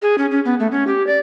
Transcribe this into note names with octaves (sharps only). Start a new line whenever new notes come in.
G#4
C#4
C#4
B3
A3
C#4
G4
D5